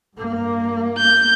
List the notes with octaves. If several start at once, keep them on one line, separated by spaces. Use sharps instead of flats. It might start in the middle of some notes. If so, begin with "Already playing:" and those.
G2 A#3
G6